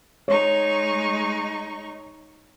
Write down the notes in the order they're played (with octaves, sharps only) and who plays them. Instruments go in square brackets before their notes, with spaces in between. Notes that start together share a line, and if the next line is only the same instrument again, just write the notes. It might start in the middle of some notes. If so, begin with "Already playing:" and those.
[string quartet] G#3 D#4 C#6 [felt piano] C#5